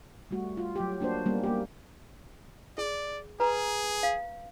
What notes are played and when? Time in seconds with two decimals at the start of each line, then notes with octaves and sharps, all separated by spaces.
0.31 G3 A3 F#4
0.57 F4
0.76 F#3 G4
1.00 A#3 D4 F#4 C5
1.26 G3 A#3 B3 C#4
1.44 A#3 G4
2.78 G#4 D5
3.40 G#4 B4 A#5
4.03 F5